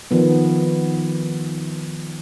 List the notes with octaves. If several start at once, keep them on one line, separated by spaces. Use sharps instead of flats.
D#3 F3 B3